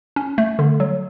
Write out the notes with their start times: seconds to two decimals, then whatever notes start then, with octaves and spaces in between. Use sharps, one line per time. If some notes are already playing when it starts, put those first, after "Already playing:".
0.16 C#4
0.38 A3
0.59 D3
0.80 F#3